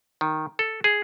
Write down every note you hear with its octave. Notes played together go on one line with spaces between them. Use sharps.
D#3
A4
G#4